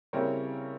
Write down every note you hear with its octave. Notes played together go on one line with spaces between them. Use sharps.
C#3 G3 C4 E4 A#4 C#5